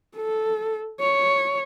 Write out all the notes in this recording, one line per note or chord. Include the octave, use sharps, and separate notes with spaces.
A4
C#5